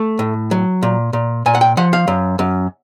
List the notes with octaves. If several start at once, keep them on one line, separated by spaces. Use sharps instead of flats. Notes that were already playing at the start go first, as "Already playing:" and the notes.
Already playing: A3
A2
F#3
A#2
A#2
A#2 G#5
F#5
G5
F3 F#5
F5
F#2
F#2